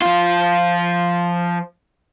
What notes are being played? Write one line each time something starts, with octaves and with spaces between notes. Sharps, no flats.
F3 F4